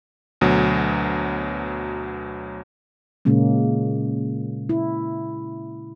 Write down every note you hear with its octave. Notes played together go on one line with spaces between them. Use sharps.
D2 B2 F#3
A#2 C#3 G#3 A#3 C#4
E4